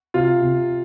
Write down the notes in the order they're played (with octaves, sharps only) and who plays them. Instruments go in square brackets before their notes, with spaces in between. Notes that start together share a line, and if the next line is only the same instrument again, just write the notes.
[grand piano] C3 F4
C3